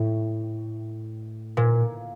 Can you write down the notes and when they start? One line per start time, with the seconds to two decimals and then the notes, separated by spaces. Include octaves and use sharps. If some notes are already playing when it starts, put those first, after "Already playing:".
Already playing: A2
1.57 A#2